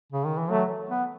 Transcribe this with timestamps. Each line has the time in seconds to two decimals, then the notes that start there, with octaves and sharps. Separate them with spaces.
0.13 C#3
0.26 D#3
0.38 E3
0.50 F#3 A3
0.90 B3